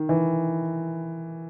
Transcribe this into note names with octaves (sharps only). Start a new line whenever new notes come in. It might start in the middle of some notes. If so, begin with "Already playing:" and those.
Already playing: D#3
E3